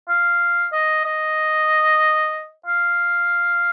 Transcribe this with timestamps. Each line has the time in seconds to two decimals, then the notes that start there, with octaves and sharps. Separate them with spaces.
0.09 F5
0.72 D#5
1.05 D#5
2.66 F5